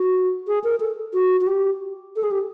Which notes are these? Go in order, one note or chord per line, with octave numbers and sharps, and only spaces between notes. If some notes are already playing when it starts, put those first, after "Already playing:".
Already playing: F#4
G#4
A#4
A4
F#4
F#4
G4
A4
G#4
G4